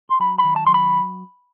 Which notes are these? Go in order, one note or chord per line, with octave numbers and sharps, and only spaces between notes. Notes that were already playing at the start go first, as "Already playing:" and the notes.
C6
F#3 B5
B5
D#3
A5
F#3 C6
B5